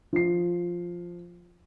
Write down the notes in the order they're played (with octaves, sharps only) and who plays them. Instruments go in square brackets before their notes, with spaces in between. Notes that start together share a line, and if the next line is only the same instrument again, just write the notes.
[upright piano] F3 C7